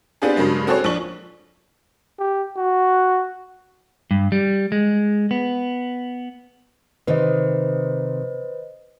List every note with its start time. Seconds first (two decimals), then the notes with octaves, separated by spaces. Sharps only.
0.22 B3 C4 D4 F4 G4 G#4
0.36 G2 C#3 F#3 G#3 A#3
0.67 C4 F#4 G#4 A4 C5 C#5
0.84 A#1 F3 D4 C#6 F#7
2.19 G4
2.57 F#4
4.11 G2
4.32 G3
4.72 G#3
5.31 B3
7.07 C3 D#3 B4 C5 D#5